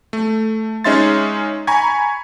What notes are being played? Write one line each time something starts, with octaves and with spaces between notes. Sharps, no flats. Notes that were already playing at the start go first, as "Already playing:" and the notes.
A3
G#3 C#4 D#4 E5 C6 A6
G#5 A#5 B5 C#6 G#6